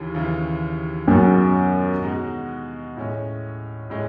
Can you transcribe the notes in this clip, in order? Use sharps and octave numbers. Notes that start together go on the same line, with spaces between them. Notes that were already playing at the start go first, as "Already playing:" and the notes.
Already playing: D#2 C#3 E3
D#2 C#3 E3
F#2 B2 G#3 D#4 F#4
B2 G#3 D#4 F#4
A2 G#3 C#4
A2 G#3 C#4